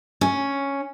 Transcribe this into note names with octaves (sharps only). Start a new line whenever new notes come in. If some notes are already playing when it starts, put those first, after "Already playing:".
C#4